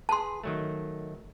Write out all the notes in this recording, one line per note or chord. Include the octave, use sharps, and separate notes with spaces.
G#4 B4 A5 C6
D#3 F#3 A3